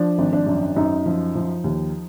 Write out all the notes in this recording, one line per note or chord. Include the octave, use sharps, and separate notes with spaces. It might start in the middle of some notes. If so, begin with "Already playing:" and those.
Already playing: F3 D4
G#1
D4
F#2
F#2 D#4
F3
F3
D#2